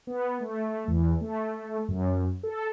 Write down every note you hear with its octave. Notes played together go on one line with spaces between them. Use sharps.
B3
A3
E2
A3
F#2
A4